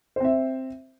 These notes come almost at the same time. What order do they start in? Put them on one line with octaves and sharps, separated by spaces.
C5 C4 E5